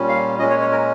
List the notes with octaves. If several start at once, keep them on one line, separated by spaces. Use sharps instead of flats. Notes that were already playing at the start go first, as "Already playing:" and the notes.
Already playing: A#2 G3 C#4
F5
A#2 G#3 C#4 D#5
C#5
C#5
A#4